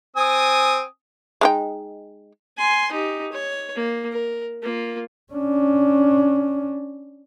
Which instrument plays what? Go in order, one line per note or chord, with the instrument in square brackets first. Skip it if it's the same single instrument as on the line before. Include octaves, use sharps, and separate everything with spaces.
[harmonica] C4 G#5 D#6
[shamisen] G#3 D#4 G5
[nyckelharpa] G#5 C6
D#4 G4
C#5
A#3
A#4
A#3 F4
[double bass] C#4 D4